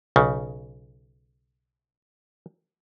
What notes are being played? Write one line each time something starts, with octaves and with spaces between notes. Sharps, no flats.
B1 C#3